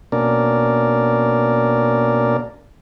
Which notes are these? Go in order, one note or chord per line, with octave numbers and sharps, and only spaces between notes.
B2 A#3 C#4 D4 A#4 D5